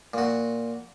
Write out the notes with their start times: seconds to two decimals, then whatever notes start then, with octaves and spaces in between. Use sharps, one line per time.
0.14 A#2 F#4